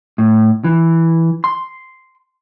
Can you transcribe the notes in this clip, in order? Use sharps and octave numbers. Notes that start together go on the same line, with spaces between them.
A2
E3
C6